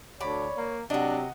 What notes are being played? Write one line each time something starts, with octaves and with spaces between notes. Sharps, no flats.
D2 C#5 D5 B5
A#3
C3 F#3 D4 F#4 D#5